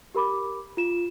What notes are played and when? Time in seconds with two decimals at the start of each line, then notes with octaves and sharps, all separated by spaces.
0.15 G4 A#4 B5 D6
0.77 F4 E7